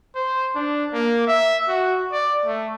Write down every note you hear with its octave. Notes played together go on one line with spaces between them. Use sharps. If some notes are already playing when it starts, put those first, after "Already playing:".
C5
D4
A#3
E5
F#4
D5
A3